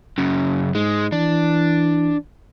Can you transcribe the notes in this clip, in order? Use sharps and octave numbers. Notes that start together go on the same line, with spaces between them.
F#2 C#3
G#2 G#3
E3 D4